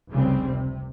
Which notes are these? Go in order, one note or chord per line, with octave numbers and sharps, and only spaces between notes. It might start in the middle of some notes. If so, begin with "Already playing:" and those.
F1 C#2 C#3 G3 C4
C3